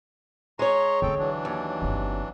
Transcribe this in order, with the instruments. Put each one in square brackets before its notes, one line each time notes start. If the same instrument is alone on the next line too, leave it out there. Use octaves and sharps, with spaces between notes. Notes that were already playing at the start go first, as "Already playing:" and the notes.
[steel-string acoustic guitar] G#3 C#5 [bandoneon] A#5 C6 C#6
[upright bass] D3 F4 [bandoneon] C4 A4 G5
[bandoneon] E3 F#3 D4
[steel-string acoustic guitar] D#2
[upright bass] G1 C4